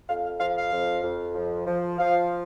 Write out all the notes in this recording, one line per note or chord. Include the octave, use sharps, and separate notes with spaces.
F2 F5
F5
F3 F5
F5
F2
F2
F3
F3
F3 F5